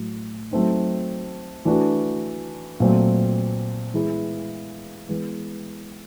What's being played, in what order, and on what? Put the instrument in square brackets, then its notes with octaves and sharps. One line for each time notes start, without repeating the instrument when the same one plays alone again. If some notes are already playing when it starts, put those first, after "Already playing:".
Already playing: [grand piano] A2 F#3
F#3 A3 C4 D#4
E3 A3 D4 F#4
A#2 F#3 A3 C4
E3 G#3 B3 E4 G#4
E3 G#3 B3